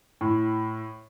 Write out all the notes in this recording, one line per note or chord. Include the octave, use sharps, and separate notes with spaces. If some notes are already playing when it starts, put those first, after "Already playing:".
A2